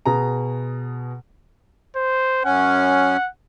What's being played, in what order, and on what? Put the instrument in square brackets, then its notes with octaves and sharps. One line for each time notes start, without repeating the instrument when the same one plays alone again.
[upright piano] B2 G#4 A#5
[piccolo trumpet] C5
[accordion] F#2 C#4 [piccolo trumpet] F#5